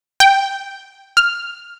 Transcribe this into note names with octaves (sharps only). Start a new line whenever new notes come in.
G5
F6